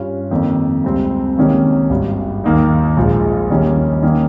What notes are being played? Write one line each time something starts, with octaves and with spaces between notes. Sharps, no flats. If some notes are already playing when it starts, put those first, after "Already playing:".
Already playing: G2 G3 C#4 F4
F2 D#3 A#3
C#2 C3 G3 C4
C#2 C3 D#3 A#3 C#4
G#1 G2 G3
D#2 D#3 A#3 D#4
A#1 G#2 F3 G#3
D#2 D#3 G3 A#3 C#4
D#3 A#3 C#4